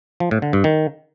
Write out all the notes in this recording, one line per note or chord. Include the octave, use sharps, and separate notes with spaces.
F3
A2
D3
G2
D#3